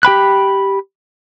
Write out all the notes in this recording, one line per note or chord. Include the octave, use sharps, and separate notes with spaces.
G4 G5 B5 F#6